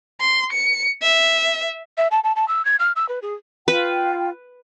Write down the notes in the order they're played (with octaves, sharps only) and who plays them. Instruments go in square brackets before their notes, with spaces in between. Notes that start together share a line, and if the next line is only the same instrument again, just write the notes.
[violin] C6
C#7
E5
[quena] E5
A5
A5
A5
E6
G#6
F6
E6
B4
G#4
[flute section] F4 G5 [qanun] B4